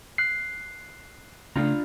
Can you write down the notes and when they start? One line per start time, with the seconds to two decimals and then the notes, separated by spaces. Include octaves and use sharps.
0.18 F#6 C7
1.56 C#3 A3 D4 F4 A#5